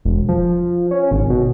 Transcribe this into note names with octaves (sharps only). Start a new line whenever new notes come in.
E1
F3
C#4
G#1
B2